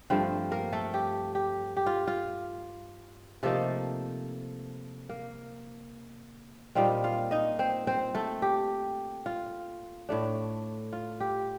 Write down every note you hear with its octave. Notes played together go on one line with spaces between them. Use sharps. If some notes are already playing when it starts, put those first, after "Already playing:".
G2 F3 A3 C4 C5
A#3 A#4
A3 A4
G4
G4
G4
F4
F4
C3 F3 A3 A#3 D#4 A4
A#3 A#4
A#2 G3 C4 D#4 F4 F5
F4 F5
D#4 D#5
C4 C5
C4 C5
A3 A4
G4
F4
A2 A3 D4
F4
G4